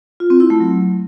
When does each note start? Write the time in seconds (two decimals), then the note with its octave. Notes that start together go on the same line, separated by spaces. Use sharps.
0.20 F4
0.30 C4
0.40 E4
0.50 A3
0.60 F#3